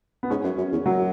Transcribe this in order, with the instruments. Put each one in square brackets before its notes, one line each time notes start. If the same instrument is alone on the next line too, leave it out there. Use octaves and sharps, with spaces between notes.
[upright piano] B3
[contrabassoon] G#2 [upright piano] C#4
[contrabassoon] F#2
F#2
E2
[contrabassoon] F#2 [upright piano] F#3